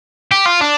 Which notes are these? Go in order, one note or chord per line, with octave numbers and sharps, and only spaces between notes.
G4
F4
D4